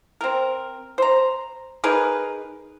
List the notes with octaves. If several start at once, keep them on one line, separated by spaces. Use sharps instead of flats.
C4 A#4
C5 A#5
D#4 G#4 A#4 B4